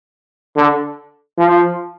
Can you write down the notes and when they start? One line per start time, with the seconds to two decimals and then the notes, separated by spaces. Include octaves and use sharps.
0.56 D3
1.38 F3